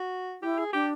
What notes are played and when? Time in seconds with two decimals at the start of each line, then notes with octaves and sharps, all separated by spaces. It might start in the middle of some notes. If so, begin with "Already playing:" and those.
Already playing: F#4
0.42 E4 G4
0.58 G#4
0.73 D4 G4